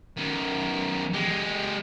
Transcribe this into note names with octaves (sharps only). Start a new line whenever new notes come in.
F#2 D#3
G#3 G4